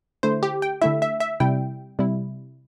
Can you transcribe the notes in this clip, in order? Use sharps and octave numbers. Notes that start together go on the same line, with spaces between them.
D3 A3 E4 C5
G4
G5
D3 A3 E4 E5
E5
E5
C3 G3 E4 G5
C3 G3 E4